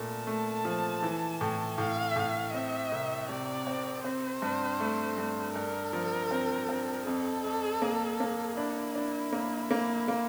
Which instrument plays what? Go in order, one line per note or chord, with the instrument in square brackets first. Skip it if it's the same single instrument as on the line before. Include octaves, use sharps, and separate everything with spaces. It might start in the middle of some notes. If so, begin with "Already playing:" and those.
Already playing: [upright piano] A#2 A3 [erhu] A5
[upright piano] A3
F3
E3
A2
[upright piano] A2 [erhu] F5
[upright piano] A2
[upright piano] C4 [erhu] E5
[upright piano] C2
[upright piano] C3 [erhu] D5
[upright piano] C4
[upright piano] C4 [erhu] C5
[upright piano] G2
A3
G2
[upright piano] G2 [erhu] A#4
[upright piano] F3
C4
C4
[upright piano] F2 [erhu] A4
[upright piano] F2
A#3
A#3
[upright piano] D4 [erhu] E4
[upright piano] D4
A#3
A#3
A#3